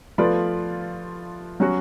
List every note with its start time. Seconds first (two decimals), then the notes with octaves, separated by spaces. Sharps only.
0.18 F3 A3 F4 B4 D5
1.60 F#3 C#4 F#4